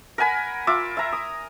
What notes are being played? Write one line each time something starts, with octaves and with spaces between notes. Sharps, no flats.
A#4 F#5 G#5 B5
F4 E5 D6 E6
E5 A#5
D#6